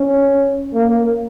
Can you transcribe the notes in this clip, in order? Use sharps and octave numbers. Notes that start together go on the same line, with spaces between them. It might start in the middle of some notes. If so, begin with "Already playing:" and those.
Already playing: C#4
A#3